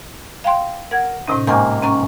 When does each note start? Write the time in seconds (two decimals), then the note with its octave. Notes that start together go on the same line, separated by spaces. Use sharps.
0.44 F5 G5 C6
0.91 A#4 F#5 G#6
1.28 A2 C3 C#4 D#4
1.47 G#2 C3 A#3 G#5 C#6 G6
1.82 C#4 A#5 C#6